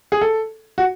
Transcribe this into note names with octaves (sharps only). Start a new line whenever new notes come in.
G#4
A4
F#4